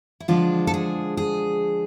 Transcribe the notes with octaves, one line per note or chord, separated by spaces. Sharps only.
E4
D3 F3 G#3 D4 F4
A4
G#4
G#4